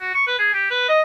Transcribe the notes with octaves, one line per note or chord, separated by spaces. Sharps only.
F#4
C#6
B4
G#4
G4
B4
D#5